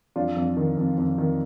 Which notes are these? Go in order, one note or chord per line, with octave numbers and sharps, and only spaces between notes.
F2 D4 F4
F2
D#3
F2
F2
D#3